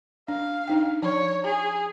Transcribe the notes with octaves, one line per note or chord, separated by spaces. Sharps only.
D4 F5
D4 D#4 G5
F3 C#5
G#4